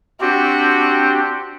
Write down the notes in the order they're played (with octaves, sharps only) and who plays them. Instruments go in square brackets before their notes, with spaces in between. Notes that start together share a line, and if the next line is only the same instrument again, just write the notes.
[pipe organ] C4 D4 G4 [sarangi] F#4